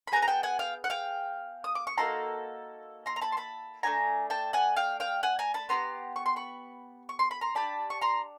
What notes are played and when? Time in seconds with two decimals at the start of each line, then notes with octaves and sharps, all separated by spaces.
0.08 B5
0.12 B3 D#4 G#4 G#5 A#5
0.22 A#5
0.28 G5 A5
0.43 F#5 G#5
0.59 F5 G5
0.84 F#5
0.90 F5 G5
1.64 D#6
1.75 D6
1.87 C#6
1.98 A#3 D#4 F#4 A4 A#5 C6
3.06 A#5 C6
3.16 A#5
3.21 A5 B5
3.32 C6
3.37 A5 B5
3.83 A3 D4 F#4 G#5 A#5
4.30 G5 A5
4.53 F#5 G#5
4.76 F5 G5
5.00 F5 G5
5.23 F#5 G#5
5.39 G#5 A#5
5.54 A5 B5
5.69 B3 E4 G4 A#5 C6
6.16 C#6
6.26 C6
6.36 B5 C#6
7.09 C#6
7.19 C6
7.31 B5
7.41 A#5 C6
7.55 D4 G4 A5 B5
7.90 C#6
8.01 A#5 C6